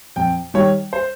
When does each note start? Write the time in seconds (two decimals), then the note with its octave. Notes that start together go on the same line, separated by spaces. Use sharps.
0.16 F2 G5
0.54 D#3 G3 C#5
0.93 C5